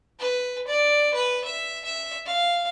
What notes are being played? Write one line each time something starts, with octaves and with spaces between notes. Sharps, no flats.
B4
D5
B4
E5
E5
F5